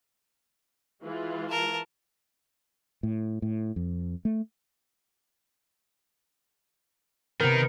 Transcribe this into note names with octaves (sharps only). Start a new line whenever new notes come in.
E3 G#3 F4
A#4 A5
A2
A2
F2
A3
C3 D#3 B3 A#4